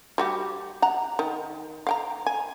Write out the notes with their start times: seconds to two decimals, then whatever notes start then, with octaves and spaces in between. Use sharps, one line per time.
0.18 G3 F#4 G4
0.82 F#5 A#5
1.19 D#3
1.87 F5 G5 A#5
2.26 G#5